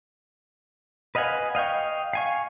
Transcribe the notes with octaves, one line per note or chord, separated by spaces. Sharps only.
B4 D#5 F5 F#5 G#5
D#5 F5 G5 C#6
F5 G#5 C#6